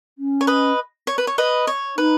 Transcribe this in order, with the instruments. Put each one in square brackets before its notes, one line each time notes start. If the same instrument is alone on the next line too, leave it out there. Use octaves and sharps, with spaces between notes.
[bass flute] C#4
[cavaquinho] C#5
B4 D#5
C#5
B4
C#5
B4 D#5
C#5
[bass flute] D#4 [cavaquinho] B4